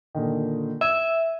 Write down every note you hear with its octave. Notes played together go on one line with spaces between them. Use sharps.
A#2 D3 D#3
E5 G#6 D#7